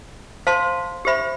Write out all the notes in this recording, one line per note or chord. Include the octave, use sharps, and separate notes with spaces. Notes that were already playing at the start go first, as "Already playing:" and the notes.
C5 F5 A5 C6
G4 C5 E5 B5